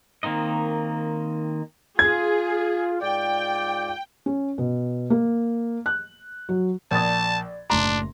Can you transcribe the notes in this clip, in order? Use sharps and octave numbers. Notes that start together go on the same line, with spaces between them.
D#3 A#3 C4 D#4 D#5
F4 G#4 G#6
G#2 F4 D5 G5
C#4
B2
A#3
F#6
F#3
A#1 D5 A5 D#6 G#6 A6
F#1 A2 D4 A#5 C6